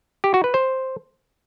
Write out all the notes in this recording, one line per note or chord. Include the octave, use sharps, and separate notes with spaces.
G4
F#4
B4
C5